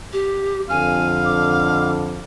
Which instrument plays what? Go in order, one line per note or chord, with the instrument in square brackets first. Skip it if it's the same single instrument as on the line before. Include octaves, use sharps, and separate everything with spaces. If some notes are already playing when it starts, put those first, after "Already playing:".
[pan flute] G4
[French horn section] F2 D3 [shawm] F5 [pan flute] G#5
[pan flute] D6